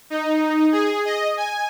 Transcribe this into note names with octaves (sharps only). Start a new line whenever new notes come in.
D#4
G#4
D#5
G#5